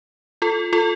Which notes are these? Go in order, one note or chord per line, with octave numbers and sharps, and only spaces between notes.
F4 A4
F4 A4